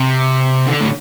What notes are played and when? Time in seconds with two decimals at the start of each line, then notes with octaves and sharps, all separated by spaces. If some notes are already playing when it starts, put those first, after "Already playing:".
Already playing: C3
0.66 D3
0.81 A2